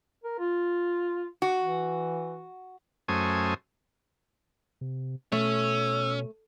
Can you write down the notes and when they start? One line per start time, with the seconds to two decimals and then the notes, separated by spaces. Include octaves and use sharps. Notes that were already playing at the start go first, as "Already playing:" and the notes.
0.24 A#4
0.39 F4
1.42 F#4
1.60 E3
3.08 F#2 A3 C#4 C5 G#5 D#6
4.81 C3
5.32 B2 A3 C#4 E6